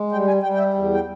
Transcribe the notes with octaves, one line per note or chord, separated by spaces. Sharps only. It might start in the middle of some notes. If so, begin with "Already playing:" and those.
Already playing: G#3
G3 G5
G#5
G3 G5
G5
E5
E2
G5